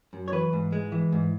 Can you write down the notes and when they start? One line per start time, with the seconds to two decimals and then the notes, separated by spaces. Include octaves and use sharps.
0.13 F#2
0.28 C#5
0.32 E3 B4
0.53 G#2
0.72 G#3
0.92 E3
1.12 G#2